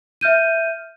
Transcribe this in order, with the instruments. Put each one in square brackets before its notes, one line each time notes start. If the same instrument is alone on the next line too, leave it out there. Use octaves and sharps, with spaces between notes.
[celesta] E5 F6 G6 D#7